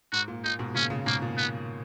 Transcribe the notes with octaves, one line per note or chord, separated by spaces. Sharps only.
G#2 F#4
A#2
A#2 D#4
G#2 B2
A#2 C#3 C#4
A#2 C#3
G#2 B2 A#3
A#2
B3